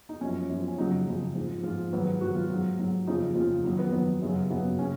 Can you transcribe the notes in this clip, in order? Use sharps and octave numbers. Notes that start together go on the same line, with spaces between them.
D#4
F#2 F3 C#4
F#2 F3
C#4
F2 C#3 F#3 D#4
F2 C#3 F#3
G#2 F3
G#2 F3 F4
G#2 D#3 F#3 B4
G#2 D#3 F#3 F#4
F4
G#2 F#3
G#2 F#3
F2 C#3 F3 D#4
F2 C#3 F3 F4
F2 D#3 F#3 D#4
B3
F2 D#3 F#3 B3
F#2 C#3 F#3
F#2 C#3 F#3 B3
C#3 C#4